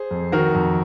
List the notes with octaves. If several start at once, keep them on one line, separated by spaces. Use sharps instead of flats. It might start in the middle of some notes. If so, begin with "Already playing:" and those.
Already playing: G#4 C5
F2
D#3 F#4 A#4
F2